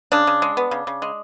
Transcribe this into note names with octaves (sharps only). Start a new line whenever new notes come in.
C#3 D4
C#3
G#3
B3
C#3
C#3
G#3